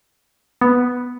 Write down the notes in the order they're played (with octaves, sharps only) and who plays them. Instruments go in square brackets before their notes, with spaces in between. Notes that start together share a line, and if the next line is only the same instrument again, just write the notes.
[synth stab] B3